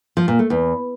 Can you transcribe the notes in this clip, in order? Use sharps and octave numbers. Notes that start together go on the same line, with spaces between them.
F3
A#2
A3
E2